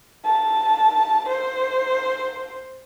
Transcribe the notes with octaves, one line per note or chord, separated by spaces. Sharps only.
A5
C5